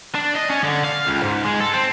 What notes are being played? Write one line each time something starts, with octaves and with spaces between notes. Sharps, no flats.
D4
D#5
C#4
D3
F5
C#2
G#2
G#3
A4
C4